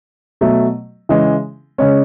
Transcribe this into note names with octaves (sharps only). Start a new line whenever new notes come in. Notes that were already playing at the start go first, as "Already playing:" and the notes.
B2 F#3 A3
C#3 E3 G#3
C#3 G#3 C#4